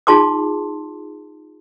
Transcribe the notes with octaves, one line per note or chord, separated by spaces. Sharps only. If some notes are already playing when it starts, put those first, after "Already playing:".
D#4 F4 G#4 A5 C6 D6